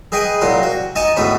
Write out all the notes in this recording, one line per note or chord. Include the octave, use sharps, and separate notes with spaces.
G#4 B4 D#5 G5 G#5
C2 A#2 F#3 A#4 C6
F#4
D#4 D#5 G#5 A5 C#6
A1 D2 G#2 B3 C#5 B5